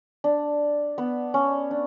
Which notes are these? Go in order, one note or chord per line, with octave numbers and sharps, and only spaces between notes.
D4
B3
C#4
D4